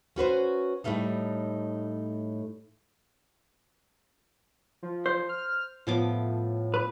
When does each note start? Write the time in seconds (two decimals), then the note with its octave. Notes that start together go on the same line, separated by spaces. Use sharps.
0.16 C#4 F#4 B4 C5
0.84 A2 G3 A3 A#3 D#4
4.83 F3
5.06 C5
5.29 F6
5.87 A2 F3 B3 D6
6.74 B4